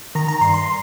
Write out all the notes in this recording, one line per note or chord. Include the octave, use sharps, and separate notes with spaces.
D#3 A#5
A#5
G2 C6
C6